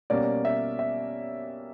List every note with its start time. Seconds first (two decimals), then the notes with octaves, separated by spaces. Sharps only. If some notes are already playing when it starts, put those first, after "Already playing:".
0.10 B2 G3 A#3 C#4 D5
0.45 E5
0.79 E5